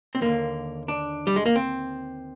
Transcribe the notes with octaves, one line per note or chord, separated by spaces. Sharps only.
C4
D#2 D3 A#3
D4
G3
G#3
A#3
C4